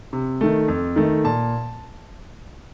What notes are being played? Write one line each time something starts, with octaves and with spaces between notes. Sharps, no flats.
C3
D#3 A3
F2
D#3 A3
A#2 A5